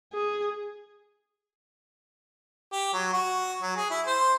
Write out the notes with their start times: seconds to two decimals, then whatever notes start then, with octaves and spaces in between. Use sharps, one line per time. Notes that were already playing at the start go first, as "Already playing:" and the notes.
0.13 G#4
2.72 G4
2.93 F#3
3.13 F#4
3.62 F#3
3.76 G#4
3.90 E4
4.07 C5